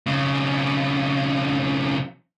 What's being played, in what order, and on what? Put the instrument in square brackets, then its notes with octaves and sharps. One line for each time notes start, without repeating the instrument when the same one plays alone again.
[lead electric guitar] B1 C#3